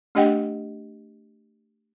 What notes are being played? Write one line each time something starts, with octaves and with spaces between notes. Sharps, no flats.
A3 D4 G4 D#5 F#5 G5